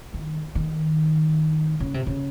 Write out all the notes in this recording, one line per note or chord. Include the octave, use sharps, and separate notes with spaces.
D#3
D#3
C#3
C3
C#3